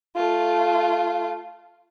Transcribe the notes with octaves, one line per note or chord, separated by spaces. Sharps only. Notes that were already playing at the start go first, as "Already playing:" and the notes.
A3 F4